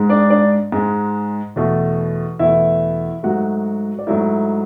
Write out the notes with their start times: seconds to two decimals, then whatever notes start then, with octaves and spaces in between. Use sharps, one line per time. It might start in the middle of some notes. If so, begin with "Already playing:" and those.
Already playing: G#2 G#3
0.09 D4 D5
0.30 D4 D5
0.72 G#2 G#3
1.56 E2 B2 A3
2.39 E2 B2 A3 E4 E5
3.23 G#2 F#3 A3 F#4 F#5
3.99 D5
4.07 G#2 F#3 A3 E4 E5